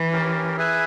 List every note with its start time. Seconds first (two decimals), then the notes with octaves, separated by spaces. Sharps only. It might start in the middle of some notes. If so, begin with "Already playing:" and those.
Already playing: E3
0.12 C#4 G4 A#4
0.57 E4 G#4 B4 E5 G#5